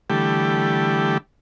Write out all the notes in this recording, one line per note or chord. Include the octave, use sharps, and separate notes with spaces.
D3 E3 G3 A3 G4